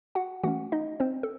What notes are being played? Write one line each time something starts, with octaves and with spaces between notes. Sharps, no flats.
F#4 F#5
E3 A3 C#4 F#4 F#5
D#4 D#5
C4 C5
A4